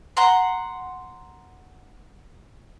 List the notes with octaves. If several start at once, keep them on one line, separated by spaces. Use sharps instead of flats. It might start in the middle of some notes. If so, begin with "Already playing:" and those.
F#5 A#5 C6